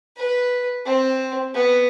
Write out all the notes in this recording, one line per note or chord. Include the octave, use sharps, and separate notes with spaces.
B4
C4
B3